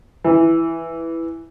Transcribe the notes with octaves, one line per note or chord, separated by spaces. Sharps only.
E3